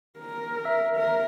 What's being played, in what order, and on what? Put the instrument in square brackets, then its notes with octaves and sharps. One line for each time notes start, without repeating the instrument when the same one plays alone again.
[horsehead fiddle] A#4
[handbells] E5 E6
[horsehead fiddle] A#4 [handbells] E5